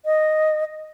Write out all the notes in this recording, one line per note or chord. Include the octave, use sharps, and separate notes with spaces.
D#5